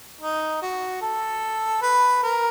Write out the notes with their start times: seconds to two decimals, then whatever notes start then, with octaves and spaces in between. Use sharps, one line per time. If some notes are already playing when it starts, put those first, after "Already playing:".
0.21 D#4
0.62 F#4
1.02 A4
1.82 B4
2.23 A#4